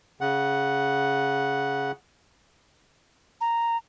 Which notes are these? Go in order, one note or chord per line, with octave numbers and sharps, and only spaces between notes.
C#3 F#5
A#5